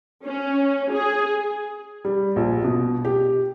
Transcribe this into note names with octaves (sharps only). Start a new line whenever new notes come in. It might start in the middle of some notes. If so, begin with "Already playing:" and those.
C#4
G#4
G3
A#1
B2
G4